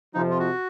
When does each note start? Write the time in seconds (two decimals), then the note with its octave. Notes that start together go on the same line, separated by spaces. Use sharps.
0.14 F2 C3 F3 D#4
0.30 F4
0.39 F#4